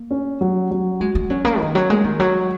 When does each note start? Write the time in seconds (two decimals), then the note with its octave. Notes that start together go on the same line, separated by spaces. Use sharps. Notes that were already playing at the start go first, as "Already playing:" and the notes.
Already playing: A#3
0.11 C#4
0.41 F#3
0.71 F#3
1.00 G#3 F#4
1.15 G#3
1.30 F#3 C#4
1.45 A#3
1.60 D#3 D#5
1.75 F#3
1.89 G#3 A#3
2.04 D#3
2.19 F#3 F#4